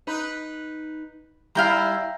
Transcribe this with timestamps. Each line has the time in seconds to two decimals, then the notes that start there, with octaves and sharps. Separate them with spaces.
0.07 D#4 B4
1.55 G3 E4 F5 G5 A#5